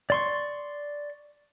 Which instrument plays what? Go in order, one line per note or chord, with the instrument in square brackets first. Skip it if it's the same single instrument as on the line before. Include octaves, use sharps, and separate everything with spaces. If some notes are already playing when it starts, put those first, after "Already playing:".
[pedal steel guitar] D5 C6 C#6